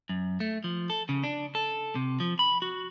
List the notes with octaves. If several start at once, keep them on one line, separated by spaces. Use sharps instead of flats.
F#2
A3
F3
A4
C#3
D4
A4
C3
F3
B5
F#4